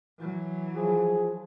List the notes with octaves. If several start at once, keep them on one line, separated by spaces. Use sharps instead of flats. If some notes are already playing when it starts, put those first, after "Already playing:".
E3 F#3
F3 G#4